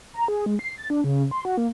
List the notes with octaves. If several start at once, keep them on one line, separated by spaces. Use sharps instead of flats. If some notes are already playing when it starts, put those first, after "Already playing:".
A#5
G#4
G#3
C7
A6
D4
C#3
C6
F#4
A#3